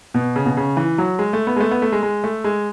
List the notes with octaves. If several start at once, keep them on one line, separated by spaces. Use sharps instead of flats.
B2
C#3
B2
C#3
E3
F#3
G#3
A3
B3
G#3
A3
B3
A3
G#3
G#3
A3
G#3